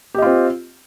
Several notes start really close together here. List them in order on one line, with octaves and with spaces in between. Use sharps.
G4 D#5 F4 C4